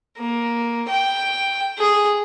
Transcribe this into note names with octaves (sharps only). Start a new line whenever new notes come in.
A#3
G5
G#4